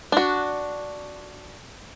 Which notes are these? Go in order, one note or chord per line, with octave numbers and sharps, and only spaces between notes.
D4 F#4